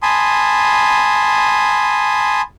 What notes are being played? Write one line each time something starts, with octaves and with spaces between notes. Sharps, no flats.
G#5 A5 B5 C6 D#6